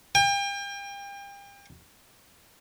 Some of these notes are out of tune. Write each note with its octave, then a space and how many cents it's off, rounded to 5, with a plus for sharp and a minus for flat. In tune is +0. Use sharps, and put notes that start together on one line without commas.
G5 +35